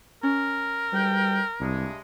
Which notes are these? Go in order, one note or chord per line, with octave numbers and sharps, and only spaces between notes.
C#4 A#4
D2 G3 B4 G5
C2 G2 C3 G#3